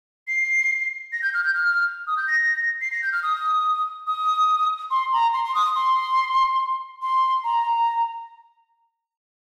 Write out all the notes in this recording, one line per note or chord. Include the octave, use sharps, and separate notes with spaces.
C7
A#6
G6
F6
G6
F6
D#6
G6
A#6
C7
A#6
G6
F6
D#6
D#6
C6
A#5
C6
C6
D#6
C6
C6
A#5